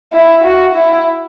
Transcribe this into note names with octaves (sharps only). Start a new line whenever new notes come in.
E4
F#4
E4